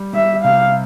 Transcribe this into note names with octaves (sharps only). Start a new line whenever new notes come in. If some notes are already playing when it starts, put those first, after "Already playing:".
Already playing: G3
G3 E5
C3 F5